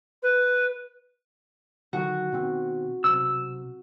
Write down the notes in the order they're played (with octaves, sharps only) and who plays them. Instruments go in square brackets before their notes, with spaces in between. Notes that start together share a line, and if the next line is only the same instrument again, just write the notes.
[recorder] B4
[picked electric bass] D3 D#3 F#3 [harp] F#4
[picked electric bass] B2 D#3 C4
[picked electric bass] B1 C3 [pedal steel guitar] E6